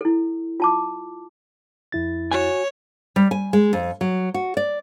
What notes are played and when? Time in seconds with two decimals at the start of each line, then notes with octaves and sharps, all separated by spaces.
0.01 E4 A4
0.60 F4 A5 D6
1.92 F2 E4 A6
2.32 F#4 C#5 G#5
3.16 G3
3.31 G#5
3.53 G#3
3.73 F2
4.01 F#3
4.34 F#4
4.57 D5